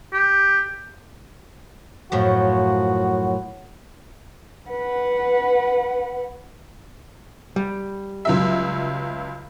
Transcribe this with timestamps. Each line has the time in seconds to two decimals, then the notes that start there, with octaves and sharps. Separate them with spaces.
0.13 G4
2.12 F#2 A2 F3 F#4
4.69 B4 F#5
7.56 G3
8.25 C#2 F#3 E5